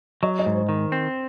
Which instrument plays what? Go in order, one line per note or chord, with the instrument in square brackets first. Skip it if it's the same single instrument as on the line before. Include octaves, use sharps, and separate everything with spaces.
[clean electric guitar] F#3 [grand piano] D#5
[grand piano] D#5
[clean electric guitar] G#2
[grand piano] C5
[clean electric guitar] D#3
C4